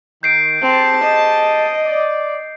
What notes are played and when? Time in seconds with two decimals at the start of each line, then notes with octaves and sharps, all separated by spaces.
0.23 D#3 G6 C7 D7
0.62 C4 G4 G#4 A5
1.03 D#5
1.84 D5